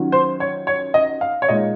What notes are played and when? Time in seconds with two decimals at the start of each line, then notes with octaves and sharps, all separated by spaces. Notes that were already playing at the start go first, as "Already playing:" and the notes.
Already playing: D#3 F#3 C#4 F4
0.12 C5
0.40 C#5
0.67 C#5
0.94 D#5
1.21 F5
1.42 C#5
1.48 A#2 G#3 D#4 D#5